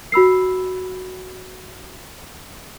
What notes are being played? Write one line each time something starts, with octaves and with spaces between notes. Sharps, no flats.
F#4 B5 E6 C7